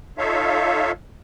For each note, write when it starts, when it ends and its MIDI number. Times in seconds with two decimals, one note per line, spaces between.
0.18 0.91 63
0.18 0.91 65
0.18 0.91 69
0.18 0.91 73
0.18 0.91 76
0.18 0.91 77